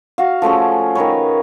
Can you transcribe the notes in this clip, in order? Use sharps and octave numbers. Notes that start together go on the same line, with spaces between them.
F#4 F5
F3 A3 C#4 G#4
D#3 A#4 B4 C#5